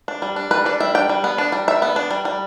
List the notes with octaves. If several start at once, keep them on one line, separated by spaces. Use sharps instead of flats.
D4
G3
D4
G3 B4
D4 D5
G3 E5
D4 G5
G3
B3
D4
G3
G3 E5
B3
D4
G3
G3